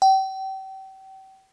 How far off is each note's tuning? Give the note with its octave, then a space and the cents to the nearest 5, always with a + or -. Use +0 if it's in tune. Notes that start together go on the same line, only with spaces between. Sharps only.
G5 -35